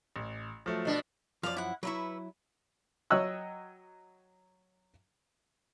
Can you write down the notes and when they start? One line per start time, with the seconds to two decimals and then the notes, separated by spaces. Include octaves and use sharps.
0.16 A1
0.66 F3 F#3 A3
0.85 B2 D4
1.43 F#2 F3 D5 F5
1.56 E4 F#5
1.83 F#3 E4 B4 E5 C#6
3.10 F#3 C#5 D#5 G5 E6 F#6